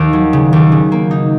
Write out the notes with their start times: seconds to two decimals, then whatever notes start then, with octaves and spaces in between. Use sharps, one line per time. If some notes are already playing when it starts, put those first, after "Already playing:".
Already playing: D#2
0.13 F#3
0.33 C#3
0.53 D#2
0.72 C#3
0.92 A#3
1.11 D#4